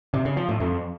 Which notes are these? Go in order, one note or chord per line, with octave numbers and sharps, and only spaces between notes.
C3
C#3
F3
A2
F2